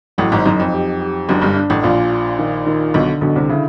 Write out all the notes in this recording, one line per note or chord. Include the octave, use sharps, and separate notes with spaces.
A1 A2 F#3
G#1 G#2
F#1 F#2 D#4
F2
G4
G4
F#1 F#2 D4
G1 G2
D4
A1 A2
A#1 A#2 F4
F4
D#3
D#3
B1 B2 D3
B1 B2 D3
C2 C3
C#3 E4